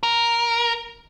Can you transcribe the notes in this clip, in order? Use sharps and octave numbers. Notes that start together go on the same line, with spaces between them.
A#4